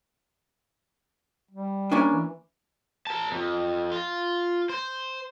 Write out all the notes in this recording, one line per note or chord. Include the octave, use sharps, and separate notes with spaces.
G3
A#3 C#4 D4
E3
A#4 A5
F2
F4
C5